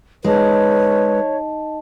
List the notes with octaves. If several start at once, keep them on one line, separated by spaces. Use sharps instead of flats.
G#3 D#4 B4 C#5 D#5 A5